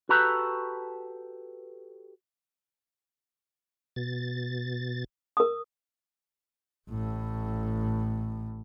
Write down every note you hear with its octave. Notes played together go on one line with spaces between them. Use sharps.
F#4 G4 A4 B4 A#5
B2 A6
A#4 D#6
A1 A2